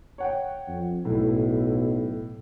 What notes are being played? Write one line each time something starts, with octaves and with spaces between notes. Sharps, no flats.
C#5 F#5 G5
F2
B1 A2 E4